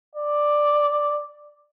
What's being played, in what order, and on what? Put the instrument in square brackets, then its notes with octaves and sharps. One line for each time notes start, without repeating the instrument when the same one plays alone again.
[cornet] D5